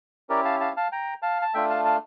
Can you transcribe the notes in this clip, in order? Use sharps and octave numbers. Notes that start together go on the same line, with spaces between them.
C#4 E4 G4 A#4 D5
F5 A5
F5 A5
F5 A5
G5 A#5
F5 A5
A5
A3 D4 F4 E5 G5
F5 A5
F5 A5